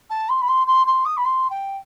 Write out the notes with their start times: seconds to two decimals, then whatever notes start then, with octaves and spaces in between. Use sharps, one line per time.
0.10 A5
0.29 C6
0.41 B5
0.48 C6
0.67 C6
0.86 C6
1.05 D#6
1.17 B5
1.25 C6
1.50 G5